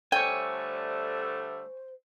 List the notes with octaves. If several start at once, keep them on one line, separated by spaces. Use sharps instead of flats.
D3 G3 A3 C5 C#5 G5 G#5